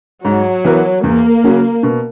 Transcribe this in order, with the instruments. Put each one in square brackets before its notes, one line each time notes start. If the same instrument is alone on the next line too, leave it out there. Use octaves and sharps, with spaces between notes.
[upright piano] G#2 [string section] F#3
[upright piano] E3 B3 F#4 A#4
[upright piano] E2 [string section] A#3
[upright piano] C#3 F#3 C#4 F#4
B2